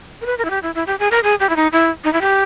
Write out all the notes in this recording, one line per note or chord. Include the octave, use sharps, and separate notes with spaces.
A#4
B4
A#4
E4
G4
E4
E4
G4
G#4
A#4
G#4
G4
E4
D#4
E4
D#4
E4
G4